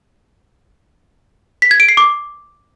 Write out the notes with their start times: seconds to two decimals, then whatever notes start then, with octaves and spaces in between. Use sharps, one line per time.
1.62 B6
1.71 G#6
1.80 D7
1.89 C7
1.97 D6